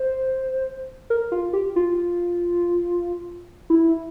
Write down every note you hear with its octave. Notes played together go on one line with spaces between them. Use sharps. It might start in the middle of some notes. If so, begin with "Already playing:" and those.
Already playing: C5
A#4
F4
G4
F4
E4